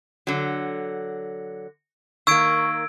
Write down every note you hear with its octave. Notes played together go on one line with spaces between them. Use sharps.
D3 F#3
D#3 A#3 C#6 E6 G#6 D7